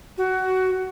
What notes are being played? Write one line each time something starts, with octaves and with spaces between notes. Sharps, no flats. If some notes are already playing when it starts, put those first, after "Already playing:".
F#4